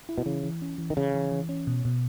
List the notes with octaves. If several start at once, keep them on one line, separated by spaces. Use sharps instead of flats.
E4
B2
C#3 E3
E3
C#4
E3
D#3
C#3 E3
E3
E3
C#4
B2
B2